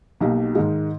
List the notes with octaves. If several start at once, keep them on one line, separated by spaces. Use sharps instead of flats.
B1 B2 A#3 D#4 G4
G#2 D#3 G#3 D#4